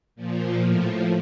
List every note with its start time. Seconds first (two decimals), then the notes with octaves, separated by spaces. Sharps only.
0.16 A#2 F3
0.61 A2 F3